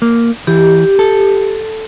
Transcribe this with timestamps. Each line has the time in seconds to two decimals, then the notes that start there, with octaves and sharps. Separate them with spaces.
0.02 A#3
0.47 E3 G4
0.99 A4